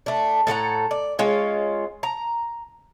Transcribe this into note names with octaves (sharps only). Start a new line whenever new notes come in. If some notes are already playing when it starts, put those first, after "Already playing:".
A3 D4
A2 A4 F#5 A#5
D5
G#3 C#4 F4 C#5
A#5